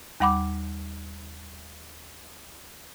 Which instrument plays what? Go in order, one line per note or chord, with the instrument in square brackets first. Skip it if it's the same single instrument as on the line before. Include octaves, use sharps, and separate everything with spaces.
[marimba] D#2 G3 F#5 B5 D6